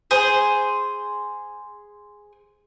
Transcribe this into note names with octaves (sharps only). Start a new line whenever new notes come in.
G#4 C5